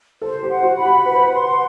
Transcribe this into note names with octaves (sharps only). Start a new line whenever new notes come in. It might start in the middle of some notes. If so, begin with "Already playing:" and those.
A4 C5
G4
F#5
F#4
B5
G4
B4 F#5
C5
B4
C6